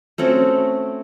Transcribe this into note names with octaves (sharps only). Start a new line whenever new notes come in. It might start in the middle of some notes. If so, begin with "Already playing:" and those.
A3 C4 C#4 F#4